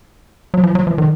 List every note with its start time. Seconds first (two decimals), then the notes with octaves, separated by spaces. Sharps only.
0.54 F#3
0.64 F3
0.75 F#3
0.87 F3
0.98 D#3